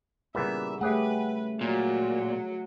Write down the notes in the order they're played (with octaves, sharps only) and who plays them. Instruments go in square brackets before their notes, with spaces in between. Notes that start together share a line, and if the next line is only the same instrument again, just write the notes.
[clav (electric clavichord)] A#2 E3 B3 [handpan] C#3 G3 G#4 [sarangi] E5
[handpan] A3 C#5 E5 [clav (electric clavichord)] G4 G#4 F#5 [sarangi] B4
[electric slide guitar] A#2 [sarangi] F#3